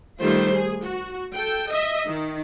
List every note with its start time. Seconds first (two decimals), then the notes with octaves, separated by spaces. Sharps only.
0.20 D#3 G3 A3 F4 C5
0.52 G#4
0.85 F#4
1.33 A4 G5
1.71 D#5 E5
2.07 D#3